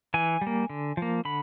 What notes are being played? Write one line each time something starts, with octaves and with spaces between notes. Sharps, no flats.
E3 G#5
G3
A#3
D3
F3 A#3
D3 B5